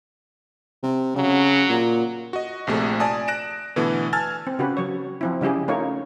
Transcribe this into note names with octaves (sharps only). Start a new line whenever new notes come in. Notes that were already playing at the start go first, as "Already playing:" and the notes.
C3
C#3 F#3
A#2
F#4 D#5
A#1 C3 A3 G#4
D5 G#5 A5 D#6
F#6 A#6 D7 E7
B2 D3 E3 A3 B3
G#5 A5 E6 F6 G#6 A6
C4
C#3 F#4 G4 B4
F#3 C#5
F3 C4 E4
C#3 G3 E4 G4 G#4
A3 C#4 D#4 F4 A#4 C#5